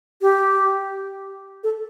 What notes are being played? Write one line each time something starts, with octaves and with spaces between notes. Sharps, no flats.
G4
A4